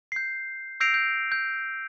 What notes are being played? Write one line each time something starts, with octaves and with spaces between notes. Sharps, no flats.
G6 C7
E6 G6 A#6 C7 D7 F7
G6
G6